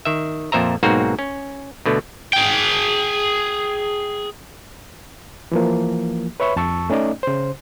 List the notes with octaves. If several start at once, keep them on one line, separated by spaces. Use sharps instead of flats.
D#3 E5
F2 A#2 C5 E5 A#5
B1 G#2 A#3 C4 F#4
C#4
B2 D3 A3
G#4 G5
E3 F3 A#3
B4 C#5 E5 B5 C#6
F2 A5 C#6 E6
A3 C#4 D#4 D5 D#5
C#3 C5